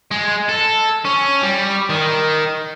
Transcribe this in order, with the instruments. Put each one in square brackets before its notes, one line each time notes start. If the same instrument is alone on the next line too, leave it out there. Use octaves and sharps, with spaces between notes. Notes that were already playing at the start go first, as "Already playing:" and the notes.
[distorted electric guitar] G#3
A4
C#4
G3
D#3